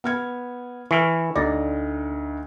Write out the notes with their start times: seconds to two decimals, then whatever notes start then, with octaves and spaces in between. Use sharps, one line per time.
0.04 B3 F6 G#6
0.91 E3 C#6 E6 F6
1.36 D2 D#4 D5 A#6